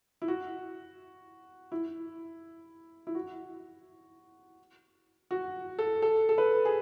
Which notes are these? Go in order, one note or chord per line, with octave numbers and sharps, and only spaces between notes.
E4
F#4
E4
E4
F#4
F#4
A4
A4
A4
B4
G#4